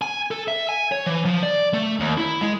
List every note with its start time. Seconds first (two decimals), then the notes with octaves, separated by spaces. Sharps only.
0.02 G#5
0.31 A4
0.48 E5
0.69 G#5
0.92 C#5
1.06 E3
1.25 F3
1.43 D5
1.74 A3
2.00 D#2
2.18 E4
2.41 G#3